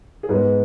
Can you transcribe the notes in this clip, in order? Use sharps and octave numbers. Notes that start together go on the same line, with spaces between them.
G#4
G#2 G#3 B3 B4